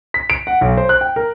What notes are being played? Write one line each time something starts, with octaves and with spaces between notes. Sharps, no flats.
B6
D7
F#5
B1
C5
F#6
G5
A#4